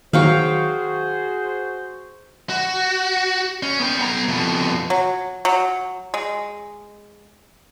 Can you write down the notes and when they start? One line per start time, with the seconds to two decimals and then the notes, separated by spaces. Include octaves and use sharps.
0.13 D#3 F#3 F#4 G#4 C5 F5 G5 C#6
2.49 F#4
3.63 C#4
3.80 B3 G5
3.98 B3 A#5
4.28 F2 B2
4.90 F#3
5.45 F#3
6.14 G#3